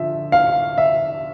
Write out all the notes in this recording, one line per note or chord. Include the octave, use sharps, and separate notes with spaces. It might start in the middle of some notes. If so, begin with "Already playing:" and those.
Already playing: D3 F3 E5
F5
E5